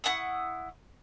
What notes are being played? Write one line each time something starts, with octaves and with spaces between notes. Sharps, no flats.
E4 F#5 C#6 D#6